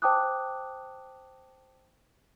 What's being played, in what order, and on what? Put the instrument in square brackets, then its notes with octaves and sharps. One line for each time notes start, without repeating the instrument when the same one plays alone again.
[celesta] C5 G5 A5 D6 D#6 F#6